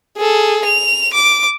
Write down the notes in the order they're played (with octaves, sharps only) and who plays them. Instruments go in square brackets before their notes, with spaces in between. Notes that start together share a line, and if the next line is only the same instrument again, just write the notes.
[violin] G#4 A4
F7
D6